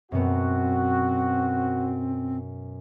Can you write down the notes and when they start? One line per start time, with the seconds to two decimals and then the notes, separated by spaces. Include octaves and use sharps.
0.12 F#2 B2 B3 C4 F#4